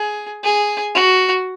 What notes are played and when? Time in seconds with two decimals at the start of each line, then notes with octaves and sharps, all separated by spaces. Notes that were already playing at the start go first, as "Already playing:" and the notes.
Already playing: G#4
0.44 G#4
0.95 F#4